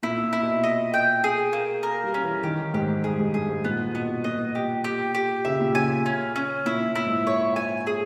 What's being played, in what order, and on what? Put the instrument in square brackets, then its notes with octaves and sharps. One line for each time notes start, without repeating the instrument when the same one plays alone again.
[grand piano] A#2 [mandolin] E4
[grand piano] A#2
[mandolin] E4
[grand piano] B2
[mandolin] D#5
G5
G#4
A#3
A#4
[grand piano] G3
[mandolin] C#4
[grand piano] E3
[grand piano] D#3 [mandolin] G4
[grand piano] G#2 [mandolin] G4
[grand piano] G2 [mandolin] G#4
[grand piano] G#2
[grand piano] G2 [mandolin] G#4
[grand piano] G#2
[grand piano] A#2 [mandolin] B3
[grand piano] B2 [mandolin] B3
[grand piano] A#2 [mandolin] D#5
[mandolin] G4
G4
G4
[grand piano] C#3 [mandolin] E5
[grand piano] A#2
[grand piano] C#3 [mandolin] G#5
[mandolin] C#4
C#4
[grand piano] A#2 [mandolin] E4
[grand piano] A#2
[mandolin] E4
[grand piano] G#2
[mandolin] C#5
G#5
G#4